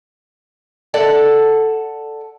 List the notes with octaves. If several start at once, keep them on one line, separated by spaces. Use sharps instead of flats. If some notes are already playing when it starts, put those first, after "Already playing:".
A4 D5 F#5 A5